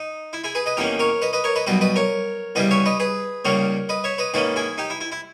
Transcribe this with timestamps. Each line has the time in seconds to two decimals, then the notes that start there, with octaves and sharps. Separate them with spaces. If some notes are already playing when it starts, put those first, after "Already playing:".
Already playing: D#4
0.33 E4
0.44 E4 G#4
0.55 G#4 B4
0.66 B4 D#5
0.77 E2 D#3 A#3 C#4 G4 A#4
0.99 A#4 C#5
1.22 B4 D#5
1.33 B4 D#5
1.44 A#4 C#5
1.56 B4 D#5
1.66 B1 B2 G3 B4 D#5
1.81 B4 D#5
1.96 A#4 C#5
2.55 E2 C#3 E3 G3 B4 D#5
2.71 C#5 E5
2.86 B4 D#5
3.00 G#4 B4
3.45 C#2 C#3 G3 A#3 A#4 C#5
3.89 B4 D#5
4.04 C#5 E5
4.18 B4 D#5
4.34 G#2 D#3 A#3 C#4 G#4 B4
4.56 E4 G#4
4.78 D#4 G4
4.90 E4
5.01 E4
5.12 E4